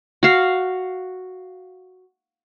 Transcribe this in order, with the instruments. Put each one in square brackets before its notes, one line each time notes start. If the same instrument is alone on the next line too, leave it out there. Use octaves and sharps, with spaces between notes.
[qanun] F#4 F5